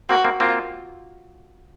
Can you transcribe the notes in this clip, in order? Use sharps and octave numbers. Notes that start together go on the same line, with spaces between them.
A#3 C4 F#4
A#3 C4
A#3 C4 F4